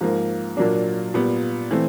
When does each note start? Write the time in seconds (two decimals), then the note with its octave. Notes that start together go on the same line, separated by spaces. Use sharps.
0.01 G#2 F3 A#3
0.57 A#2 F#3 A#3 D4
1.14 A#2 G3 B3
1.71 E3 A3 C4